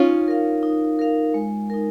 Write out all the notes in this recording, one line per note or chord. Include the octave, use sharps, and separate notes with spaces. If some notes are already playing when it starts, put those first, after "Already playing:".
Already playing: C#4 D#4 F4
A#4 F5
D#4
A#4 F5
G#3
D#4 A#4